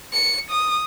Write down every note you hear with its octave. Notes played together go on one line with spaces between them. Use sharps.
C#7
D#6